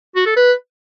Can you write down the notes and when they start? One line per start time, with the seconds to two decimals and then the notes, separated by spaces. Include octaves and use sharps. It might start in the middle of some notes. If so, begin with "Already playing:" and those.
0.16 F#4
0.26 A4
0.36 B4